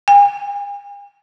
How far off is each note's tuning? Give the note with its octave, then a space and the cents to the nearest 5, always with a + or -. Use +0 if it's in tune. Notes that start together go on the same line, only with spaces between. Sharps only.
G#5 -45